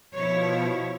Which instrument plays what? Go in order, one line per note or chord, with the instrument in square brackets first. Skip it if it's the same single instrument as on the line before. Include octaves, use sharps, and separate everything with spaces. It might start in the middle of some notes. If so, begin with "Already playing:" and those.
[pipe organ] B2 F3 [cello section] E4 C#5